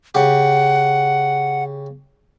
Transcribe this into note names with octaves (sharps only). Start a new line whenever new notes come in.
C#3 G4 F#5